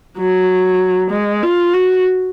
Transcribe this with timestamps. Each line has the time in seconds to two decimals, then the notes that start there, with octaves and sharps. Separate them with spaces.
0.18 F#3
1.11 G#3
1.42 F4
1.73 F#4